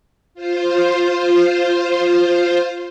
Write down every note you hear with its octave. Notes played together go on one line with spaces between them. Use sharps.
F4 C5